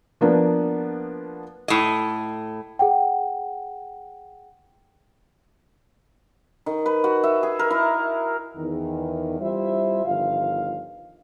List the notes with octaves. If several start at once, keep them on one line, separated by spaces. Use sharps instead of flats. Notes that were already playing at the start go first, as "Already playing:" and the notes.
F3 A#3 B3 D4
A2 D#5
G#4 F#5 G5
D#3
B4
F#4
E5
G#4
A#4
E4
E2 D#3
G3 C4 E4 F4 C5 E5
G1 D#3 F3 F5